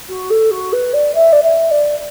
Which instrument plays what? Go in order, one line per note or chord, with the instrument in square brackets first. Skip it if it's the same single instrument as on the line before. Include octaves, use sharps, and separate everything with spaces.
[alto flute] F#4
A4
F#4
B4
D5
E5
D5
E5
D5